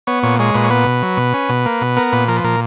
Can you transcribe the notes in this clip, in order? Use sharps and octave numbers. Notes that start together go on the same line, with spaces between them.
B3 C#5
A#2 C#5
G#3 C#5
A#2 B4
C#5
B3 B4
B2
F#3
B2
C#4
B2
A#3
B2
B3 A#4
A#2 B4
F3 A#4
B4
A#2 A#4